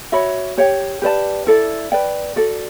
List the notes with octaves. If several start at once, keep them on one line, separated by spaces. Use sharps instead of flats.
F#4 C#5 E5 B5
G4 C#5 G5
G4 B4 D5 A5
E4 A4 D5
B4 D5 G5
F#4 A4 D5